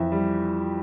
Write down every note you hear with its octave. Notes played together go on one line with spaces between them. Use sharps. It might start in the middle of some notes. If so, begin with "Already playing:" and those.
Already playing: F2 E3 E5
G3